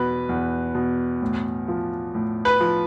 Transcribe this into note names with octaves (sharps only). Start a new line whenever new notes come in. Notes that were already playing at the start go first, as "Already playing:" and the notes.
Already playing: E2 B2 B4
E2
B2
A2
F3
A2
B4
F3